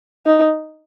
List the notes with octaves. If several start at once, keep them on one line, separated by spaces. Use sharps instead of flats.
D#4